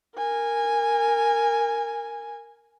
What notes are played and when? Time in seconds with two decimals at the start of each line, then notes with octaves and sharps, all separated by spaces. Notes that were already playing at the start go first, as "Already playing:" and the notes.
0.17 A#4 G#5